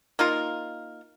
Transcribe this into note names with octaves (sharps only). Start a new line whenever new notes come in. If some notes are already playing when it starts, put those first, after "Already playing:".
A#3 D#4 F4 A#4